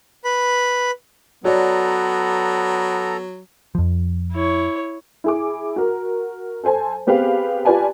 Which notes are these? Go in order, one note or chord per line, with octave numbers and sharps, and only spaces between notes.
B4 B5
F#3 B3 F#4 A4 C#5 D5 A#5
F2 F3
E4 C#5
E4 G#4 D6
F#4 A#4
A4 C5 G#5 A5
B3 C4 G4 G#4 B4 F5
F4 G4 B4 D5 G#5 A5